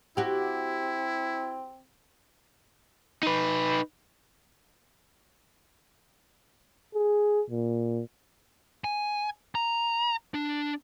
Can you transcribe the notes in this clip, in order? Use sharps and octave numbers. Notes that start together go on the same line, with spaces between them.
C4 E4 F#4 G4
D#4 B4
G#4
A#2
G#5
A#5
D4